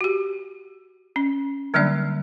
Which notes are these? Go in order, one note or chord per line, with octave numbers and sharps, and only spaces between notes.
F#4 G4
C#4
D3 F#3 G3 A#3 D4 D5